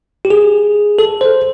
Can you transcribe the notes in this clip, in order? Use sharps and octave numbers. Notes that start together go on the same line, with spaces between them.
G4
G#4
A4
C5